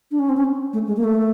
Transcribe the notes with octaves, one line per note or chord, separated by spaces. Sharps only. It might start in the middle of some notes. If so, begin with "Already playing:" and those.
D4
C#4
C4
C#4
A3
G#3
A#3
A3